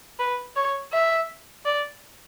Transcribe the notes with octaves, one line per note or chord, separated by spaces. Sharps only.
B4
C#5
E5
D5